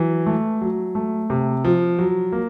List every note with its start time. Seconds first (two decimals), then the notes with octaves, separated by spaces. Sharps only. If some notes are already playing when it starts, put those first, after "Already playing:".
Already playing: E3 F#3
0.26 A3
0.61 F#3
0.95 A3
1.30 C3
1.64 F3
1.99 F#3
2.32 A#3